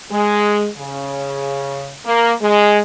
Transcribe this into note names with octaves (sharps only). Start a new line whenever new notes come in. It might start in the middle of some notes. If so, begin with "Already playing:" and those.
G#3
C#3
A#3
G#3